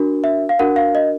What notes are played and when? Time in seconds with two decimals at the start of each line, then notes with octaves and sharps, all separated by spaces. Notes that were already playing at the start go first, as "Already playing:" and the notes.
Already playing: D4 F#4 A#4
0.24 E5
0.49 F5
0.59 D4 F#4 A#4 F#5
0.76 F5
0.95 D#5